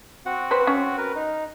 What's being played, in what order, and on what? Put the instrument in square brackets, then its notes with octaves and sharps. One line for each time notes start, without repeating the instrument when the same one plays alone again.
[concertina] C4 F#4 F#5
[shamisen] B4 C5
C#4
[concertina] A#4 B4
D#4